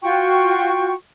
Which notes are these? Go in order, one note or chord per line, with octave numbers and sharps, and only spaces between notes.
F4 F#4 G5 C#6